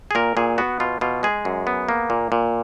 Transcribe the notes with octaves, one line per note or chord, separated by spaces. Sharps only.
G#4
A#2 A#4
A#2 G#4
B3 F#4
B2 F4
B2 F4
G#3 G#4
F#2
B3
A#3
A#2
A#2